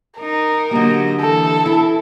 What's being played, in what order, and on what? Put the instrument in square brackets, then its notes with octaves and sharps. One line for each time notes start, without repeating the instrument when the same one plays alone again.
[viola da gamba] D#4 [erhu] A#4
[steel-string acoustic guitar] D3 A#3 [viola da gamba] F#3 G4 D#5
[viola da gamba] E3 [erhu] A4
[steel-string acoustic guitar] E4